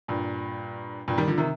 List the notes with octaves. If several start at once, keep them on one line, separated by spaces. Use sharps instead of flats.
G2 A#2
G2 A#2
D#3 G3
D3 F3
C3 D#3